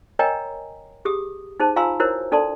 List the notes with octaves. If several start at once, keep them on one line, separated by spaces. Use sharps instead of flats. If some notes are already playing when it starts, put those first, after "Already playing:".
A#4 C#5 D#5 G5 G#5 A#5
G4 G#4 D#6
D#4 G#4 C5 A5
F4 F5 G#5 A#5 C6 E6
E4 F#4 A#4 C5 C#5
D4 A4 D5 A5 C6